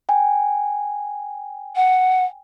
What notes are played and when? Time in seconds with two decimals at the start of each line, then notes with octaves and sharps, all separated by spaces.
0.09 G5 G#5
1.76 F#5